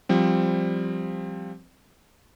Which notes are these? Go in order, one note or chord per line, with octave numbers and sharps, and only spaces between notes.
F3 G3 C4